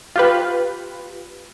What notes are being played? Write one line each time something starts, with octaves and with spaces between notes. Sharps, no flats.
F4 G4 B4